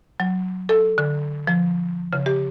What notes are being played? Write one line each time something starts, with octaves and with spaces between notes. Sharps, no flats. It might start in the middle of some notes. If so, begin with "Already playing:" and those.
F#3
A4
D3
F3
C#3
G4